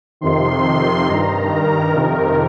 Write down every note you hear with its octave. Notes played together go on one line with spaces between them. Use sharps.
F2 C3 D#3 C6
G2 D#3 A#5
A#4
F2 C3 D#3